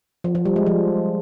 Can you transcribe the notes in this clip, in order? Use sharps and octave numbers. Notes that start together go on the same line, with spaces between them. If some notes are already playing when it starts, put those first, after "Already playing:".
F3
F3
G3
G#3
F3